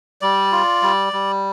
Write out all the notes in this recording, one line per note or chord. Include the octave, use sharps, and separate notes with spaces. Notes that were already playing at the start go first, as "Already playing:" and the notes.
G3 D5
F4
G3
G3